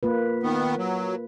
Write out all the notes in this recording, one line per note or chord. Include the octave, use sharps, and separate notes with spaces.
A#3 F4 B4
D#3 B3
F#3